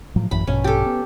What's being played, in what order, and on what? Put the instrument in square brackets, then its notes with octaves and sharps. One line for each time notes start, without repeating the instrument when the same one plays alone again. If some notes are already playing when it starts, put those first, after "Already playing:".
[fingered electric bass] A2 F3 F#3
[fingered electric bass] A1 F#2 E3 [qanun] B5
[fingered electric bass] A#1 G2 B2 [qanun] C#4
[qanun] G4 A4
[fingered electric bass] B3